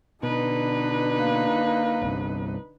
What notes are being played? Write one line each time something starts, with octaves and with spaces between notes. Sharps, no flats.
B2 D3 D#4 B4
A#3
G1 C2 G2